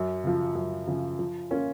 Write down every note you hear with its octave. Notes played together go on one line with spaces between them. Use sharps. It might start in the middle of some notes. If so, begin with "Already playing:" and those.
Already playing: F#2
C#3 F3
F#2
C#3 F3
F3
A#3 C#4 F4